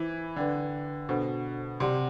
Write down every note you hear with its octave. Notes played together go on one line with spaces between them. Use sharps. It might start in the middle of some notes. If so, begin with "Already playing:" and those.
Already playing: E3 C5 E5 B5 D6
D3 B4 D5 G5 D6
B2 D4 A4 C5
C3 G4 D5 F#5 C6